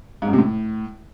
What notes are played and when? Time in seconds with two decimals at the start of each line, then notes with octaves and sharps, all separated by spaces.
0.22 G#2
0.28 F#2
0.33 C3
0.38 A2